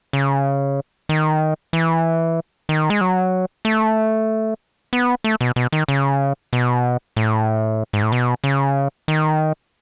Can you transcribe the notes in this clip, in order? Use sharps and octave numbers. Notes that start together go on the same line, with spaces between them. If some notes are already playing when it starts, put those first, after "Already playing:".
C#3
D#3
E3
D#3
G#3
F#3
A3
B3
A3
B2
B2
D#3
C#3
B2
A2
G#2
A2
B2
C#3
D#3